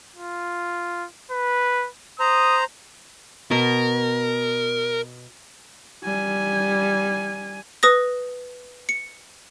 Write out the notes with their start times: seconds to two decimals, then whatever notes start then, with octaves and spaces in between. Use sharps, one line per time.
0.15 F4
1.31 B4
2.20 C5 A#5 D#6
3.51 B2 A#4
6.03 G3 G#5
7.83 B4 D#6 A#6
8.89 C#7